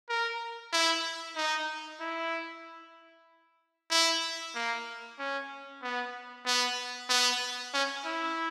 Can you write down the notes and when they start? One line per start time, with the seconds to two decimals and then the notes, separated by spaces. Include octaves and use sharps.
0.09 A#4
0.73 E4
1.37 D#4
2.01 E4
3.91 E4
4.55 A#3
5.19 C#4
5.83 B3
6.46 B3
7.10 B3
7.74 C#4
8.05 E4